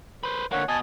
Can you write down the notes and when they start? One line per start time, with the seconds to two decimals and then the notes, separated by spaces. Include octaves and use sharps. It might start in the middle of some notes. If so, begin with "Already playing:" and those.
0.23 B4 C5
0.52 D3 A#3 C#5 F#5
0.69 B2 D#5 G#5 A5